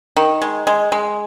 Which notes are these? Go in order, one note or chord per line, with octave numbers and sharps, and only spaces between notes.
D#3
G#3
G#3
G#3